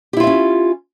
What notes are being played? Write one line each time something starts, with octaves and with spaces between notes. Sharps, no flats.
C#4 E4 F4 G4 E5